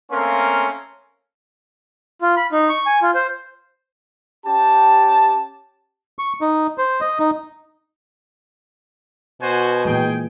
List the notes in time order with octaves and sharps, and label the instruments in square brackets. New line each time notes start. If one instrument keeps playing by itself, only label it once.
[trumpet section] A3 A#3 C4 C#4 A#4 C6
[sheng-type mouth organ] F4
B5
D#4
C#6
G#5
F4
C5
[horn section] C#4 G4 G5 A5
[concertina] C#6
D#4
C5
D#5
D#4
[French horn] B2 [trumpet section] F#4 C5 G#5
[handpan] A#2 E3 G#3 [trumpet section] G#4 G5